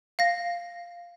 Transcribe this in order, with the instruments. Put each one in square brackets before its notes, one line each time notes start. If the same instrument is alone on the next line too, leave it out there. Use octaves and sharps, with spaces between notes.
[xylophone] F5 A#6